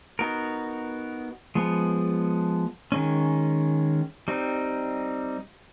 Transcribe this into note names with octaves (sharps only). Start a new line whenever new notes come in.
B3 D#4 F#4 A#4
F3 G#3 B3
D#3 G#3 C#4
G3 C4 D#4